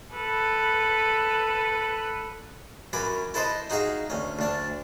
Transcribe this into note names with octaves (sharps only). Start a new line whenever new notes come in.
A4 B4
F#2 F#3 C#4 B4 D6
E4 A4 B4 C5 D#5
D#4 F#4 G#4 E5 F5
D2 C#4
D2 D4 A5